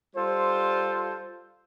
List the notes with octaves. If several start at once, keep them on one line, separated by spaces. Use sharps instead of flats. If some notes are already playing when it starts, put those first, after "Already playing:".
G3 F4 A4 C5